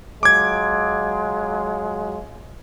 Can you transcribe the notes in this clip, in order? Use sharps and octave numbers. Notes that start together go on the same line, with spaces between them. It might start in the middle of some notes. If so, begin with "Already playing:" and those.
F#3 G#3 F4 D6 G#6